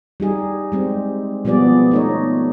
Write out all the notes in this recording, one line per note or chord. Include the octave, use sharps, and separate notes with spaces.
G3 D#4 G#4
G3 G#3 C4
B2 F3 G3 B3 G#4 D5
A3 D#4 C#5